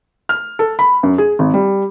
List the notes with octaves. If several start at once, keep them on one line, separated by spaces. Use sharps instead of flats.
F6
A4
B5
F#2
G#4
G#1
G3